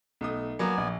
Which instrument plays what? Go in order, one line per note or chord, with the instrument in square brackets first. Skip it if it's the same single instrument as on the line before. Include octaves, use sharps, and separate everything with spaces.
[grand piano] B1 A3 D#6
[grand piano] F#3 A#3 [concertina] B3 D5 G#5
[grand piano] A#1